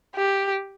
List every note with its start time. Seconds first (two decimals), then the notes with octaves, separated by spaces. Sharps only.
0.15 G4